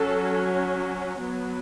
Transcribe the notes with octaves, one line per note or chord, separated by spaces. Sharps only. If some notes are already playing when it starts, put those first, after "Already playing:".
Already playing: F#3 C#4 A4
F#3 B3